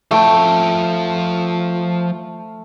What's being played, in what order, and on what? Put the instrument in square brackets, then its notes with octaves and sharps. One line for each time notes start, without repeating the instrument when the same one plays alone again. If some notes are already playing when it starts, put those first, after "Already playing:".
[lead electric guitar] F3 G5 [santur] A3